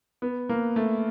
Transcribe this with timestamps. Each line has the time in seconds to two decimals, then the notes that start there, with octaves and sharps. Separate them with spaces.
0.22 B3
0.49 A#3
0.76 A3